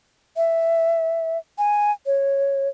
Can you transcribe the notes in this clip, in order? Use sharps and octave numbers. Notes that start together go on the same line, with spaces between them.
E5
G#5
C#5